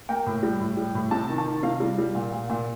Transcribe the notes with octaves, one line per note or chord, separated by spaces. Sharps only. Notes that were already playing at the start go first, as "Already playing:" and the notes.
A#3 G5
A2
G3
A2
G3
A2
C3 A5
D#3
A5
D#3
C3 F5
G3
G3
A#2
A#2
A#2